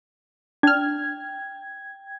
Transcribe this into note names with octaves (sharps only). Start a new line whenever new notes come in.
D4 G5 F6 G#6